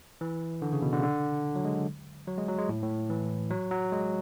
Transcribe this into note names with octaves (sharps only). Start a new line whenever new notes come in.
E3
D3
C#3
B2
D3
C#3
D3
F#3
G#3
F#3
G#3
F#3
G#3
A2
A2
E3
F#3
F#3
G#3